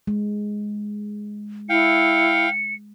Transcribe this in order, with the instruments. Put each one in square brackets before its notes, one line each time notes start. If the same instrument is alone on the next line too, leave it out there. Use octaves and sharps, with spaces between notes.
[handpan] G#3
[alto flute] E4 [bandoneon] F5 G5 [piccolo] C#7